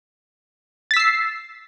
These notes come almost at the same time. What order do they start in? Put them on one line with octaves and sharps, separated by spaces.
A6 B6 E6 C7